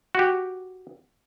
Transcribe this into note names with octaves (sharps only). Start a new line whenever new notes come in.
F#4 G4